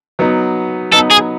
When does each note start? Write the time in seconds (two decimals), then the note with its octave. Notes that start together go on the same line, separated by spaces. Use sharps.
0.19 F#3 B3 D#4
0.92 F#3 B3 D#4 A4
1.10 G#4